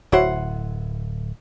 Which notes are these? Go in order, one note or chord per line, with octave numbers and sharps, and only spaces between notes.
D1 E4 F#4 C5 C#5 F#5